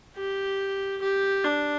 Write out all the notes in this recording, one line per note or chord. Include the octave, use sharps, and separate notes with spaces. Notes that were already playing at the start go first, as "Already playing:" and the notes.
G4
G4
D4